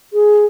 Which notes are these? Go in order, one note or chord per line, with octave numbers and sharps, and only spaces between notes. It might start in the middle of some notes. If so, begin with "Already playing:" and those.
G#4